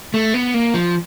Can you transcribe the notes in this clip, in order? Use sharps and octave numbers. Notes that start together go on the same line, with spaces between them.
A3
B3
A#3
F3